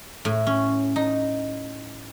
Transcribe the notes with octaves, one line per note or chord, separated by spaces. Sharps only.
A2
C#4
D#4